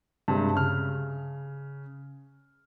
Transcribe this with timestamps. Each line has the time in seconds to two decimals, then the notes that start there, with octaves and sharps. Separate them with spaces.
0.28 G2 C3 G3 G#3
0.55 C#3 F6